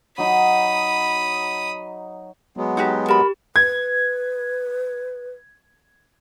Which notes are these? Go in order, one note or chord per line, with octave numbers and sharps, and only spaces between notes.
F#3 D#4 B5 D#6
F#3 G#3 B3
D#4 F#4 G4
G4 A#4 B5
B4 G#6